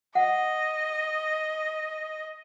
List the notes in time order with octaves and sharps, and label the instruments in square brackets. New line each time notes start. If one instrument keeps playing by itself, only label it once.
[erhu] D#5 [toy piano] F#5